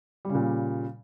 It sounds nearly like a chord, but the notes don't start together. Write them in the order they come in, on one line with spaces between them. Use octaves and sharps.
G3 C#3 A#2